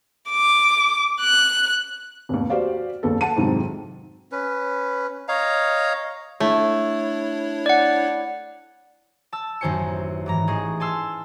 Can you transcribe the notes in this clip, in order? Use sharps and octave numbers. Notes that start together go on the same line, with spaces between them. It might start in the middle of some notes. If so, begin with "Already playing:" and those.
D6
F#6
F1 D#2
F#4 G4 C5 D5 F5
F#1 D#2 A4
F#5 A5 D#7
F2 G#2 C3 D#3 F#3
C#4 B4
C#5 D#5 F5 A#5
A3 D4 E4 C#5
D5 F#5
A5 E6
A1 F#2 D#3 C5 G#5 C#7
G#2 E3 A#5
A1 G#4 D#5 C#6
G#5 A5 C6 E6 F6